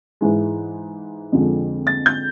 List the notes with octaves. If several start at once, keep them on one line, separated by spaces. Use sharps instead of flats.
G#2 E3 G#3
F2 D3 F3 G#3
A6
G6